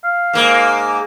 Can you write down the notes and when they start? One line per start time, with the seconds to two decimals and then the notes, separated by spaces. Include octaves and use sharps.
0.04 F5
0.33 G#2 A#3